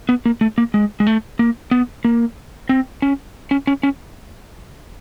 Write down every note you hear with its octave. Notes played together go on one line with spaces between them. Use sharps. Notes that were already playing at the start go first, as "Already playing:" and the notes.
B3
A#3
A3
A#3
G#3
G#3
A3
A#3
B3
A#3
C4
C#4
C#4
C#4
C#4